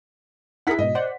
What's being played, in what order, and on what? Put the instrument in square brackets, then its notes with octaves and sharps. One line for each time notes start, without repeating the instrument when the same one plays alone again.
[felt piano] E4 B6 [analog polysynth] G#4 A#4 F#5
[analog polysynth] G#2 B2 [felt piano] D#5
[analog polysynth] C5 D5 F#5